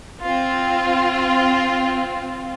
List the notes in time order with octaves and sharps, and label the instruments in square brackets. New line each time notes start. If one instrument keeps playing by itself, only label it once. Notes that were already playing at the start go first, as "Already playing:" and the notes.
[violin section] C4 F4